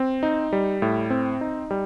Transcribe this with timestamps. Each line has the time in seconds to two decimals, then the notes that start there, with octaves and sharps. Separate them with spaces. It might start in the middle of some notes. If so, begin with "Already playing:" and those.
Already playing: C4
0.23 D#4
0.53 G3
0.82 A2
1.10 C4
1.41 D#4
1.71 G3